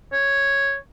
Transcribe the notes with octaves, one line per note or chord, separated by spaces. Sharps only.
C#5